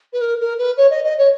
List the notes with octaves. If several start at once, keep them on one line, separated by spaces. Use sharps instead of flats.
B4
A#4
A#4
B4
C#5
D#5
D#5
C#5